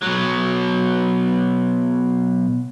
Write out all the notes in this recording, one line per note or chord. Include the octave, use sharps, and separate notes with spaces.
B2 F#3